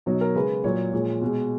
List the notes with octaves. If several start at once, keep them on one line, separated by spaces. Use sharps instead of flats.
B2 F#3 D#4
A#4
C#3 G#3 B4
A#2 F#3 C#5
A#2 F3 G#3
B2 G#3